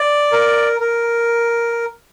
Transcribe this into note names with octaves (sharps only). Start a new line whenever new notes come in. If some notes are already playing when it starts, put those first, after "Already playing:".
Already playing: D5
A#4
A#4